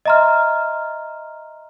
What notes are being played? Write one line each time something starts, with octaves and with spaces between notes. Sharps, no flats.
D#5 E5 A#5 C6 F6